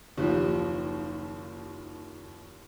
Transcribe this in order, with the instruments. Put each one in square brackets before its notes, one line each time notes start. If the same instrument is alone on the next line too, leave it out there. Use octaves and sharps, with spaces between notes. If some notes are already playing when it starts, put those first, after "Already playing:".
[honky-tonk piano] F#1 D#2 F3 G4